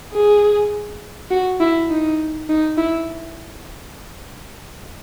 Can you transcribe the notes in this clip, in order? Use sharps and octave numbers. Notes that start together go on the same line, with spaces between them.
G#4
F#4
E4
D#4
D#4
E4